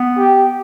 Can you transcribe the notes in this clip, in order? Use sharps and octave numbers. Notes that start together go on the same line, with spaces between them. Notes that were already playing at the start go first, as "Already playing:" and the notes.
Already playing: B3
G4